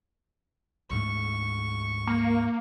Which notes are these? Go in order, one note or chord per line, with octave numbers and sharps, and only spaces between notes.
D2 G#2 A3 C#6
A#3